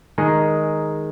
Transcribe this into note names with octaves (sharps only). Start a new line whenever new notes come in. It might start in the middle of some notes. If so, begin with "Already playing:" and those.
D#3 G#3 D#4 G#4